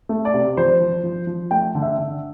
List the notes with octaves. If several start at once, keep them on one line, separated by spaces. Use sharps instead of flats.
A3
D5
C3
F3 C5
F3
F3
F3
A3 G5
D3
E5
D3